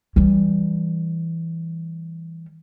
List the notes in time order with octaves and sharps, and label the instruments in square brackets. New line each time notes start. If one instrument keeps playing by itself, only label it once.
[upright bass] E3 G3